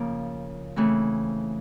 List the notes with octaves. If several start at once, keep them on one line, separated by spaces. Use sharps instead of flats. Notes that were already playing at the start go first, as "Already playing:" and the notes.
Already playing: C#3 F3 A#3
C#3 E3 A3 C4